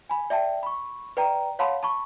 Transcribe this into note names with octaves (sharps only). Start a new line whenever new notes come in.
G#5 B5
D5 E5 G5 A5
B5 C#6
B4 D5 G5 A#5
C#5 F5 F#5 A5 B5 C6
A5 B5 C#6